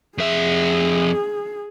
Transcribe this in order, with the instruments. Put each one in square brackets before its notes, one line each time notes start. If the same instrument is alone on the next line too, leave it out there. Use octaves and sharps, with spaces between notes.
[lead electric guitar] F2 E5 [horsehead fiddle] G#4